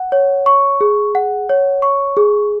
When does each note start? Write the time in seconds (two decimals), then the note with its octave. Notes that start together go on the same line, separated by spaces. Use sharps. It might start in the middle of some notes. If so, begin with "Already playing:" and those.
Already playing: F#5
0.12 C#5
0.46 C#6
0.81 G#4
1.15 F#5
1.49 C#5
1.82 C#6
2.17 G#4